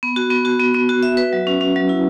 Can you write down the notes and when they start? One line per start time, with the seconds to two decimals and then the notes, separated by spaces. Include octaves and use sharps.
0.03 B3
0.16 F#4
0.30 B3
0.45 F#4
0.60 B3
0.74 B3
0.89 F#4
1.03 E5
1.17 B4
1.33 F#3
1.47 C#4
1.61 C#4
1.76 F#3
1.89 E4